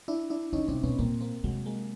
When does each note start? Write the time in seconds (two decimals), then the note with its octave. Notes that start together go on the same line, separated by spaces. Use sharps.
0.08 D4 E4
0.30 D4 E4
0.53 D3 C#4 D#4
0.68 C3 C4 D4
0.83 B2 B3 C#4
0.98 A#2 A#3 C4
1.21 A#3 C4
1.44 C3 F#3 G#3
1.66 G#3 A#3